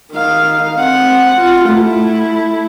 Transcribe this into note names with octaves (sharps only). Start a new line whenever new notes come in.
D#3 F5
C4 F#5
F4
A3 E4